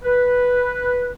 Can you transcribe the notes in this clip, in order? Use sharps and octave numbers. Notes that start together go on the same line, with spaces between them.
B4